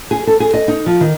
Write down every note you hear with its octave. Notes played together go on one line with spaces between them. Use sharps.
G#4
A4
G#4
D#5
D#4
F3
D#3